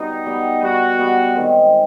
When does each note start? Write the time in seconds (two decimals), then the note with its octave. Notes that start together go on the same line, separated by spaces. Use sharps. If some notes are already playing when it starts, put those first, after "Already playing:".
Already playing: B2 G3 B3 D#4
0.26 B2 G3 B3
0.63 B2 G3 B3 F#4
0.99 B2 G3 B3
1.35 D#3 G#3 C4